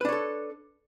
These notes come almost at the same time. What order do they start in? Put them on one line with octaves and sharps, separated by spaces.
B4 D4 C#5 A4